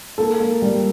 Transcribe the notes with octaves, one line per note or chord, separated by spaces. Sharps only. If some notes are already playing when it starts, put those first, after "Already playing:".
A#3 A4
A#3
G3